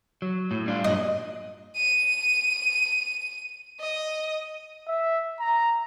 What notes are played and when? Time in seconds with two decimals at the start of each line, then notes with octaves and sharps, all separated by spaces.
0.22 F#3
0.51 A2
0.66 G3 D4 F4
0.84 G2 A#2 F#3 D#5
1.76 D#7
3.80 D#5
4.88 E5
5.40 A#5